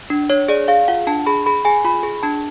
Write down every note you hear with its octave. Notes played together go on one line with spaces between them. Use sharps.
D4
D4 C#5
G#4 D5
G#4 F5
F4 F#5
D4 A5
G#4 B5
G#4 B5
G#4 G#5
F4 B5
G#4
D4 A5